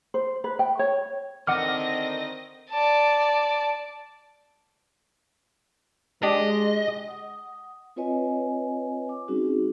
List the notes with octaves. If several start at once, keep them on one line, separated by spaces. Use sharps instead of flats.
C5
B4
G5
C#5
D3 D#3 C4 D#5 F#5 D6 F6 A#6
D5 A5
G#3 D4 G4 D5 D#5
F#5 D#6
C4 F4 B4 C#5 D#5 G#5
D6
G3 C4 C#4 D#4 F#4 G#4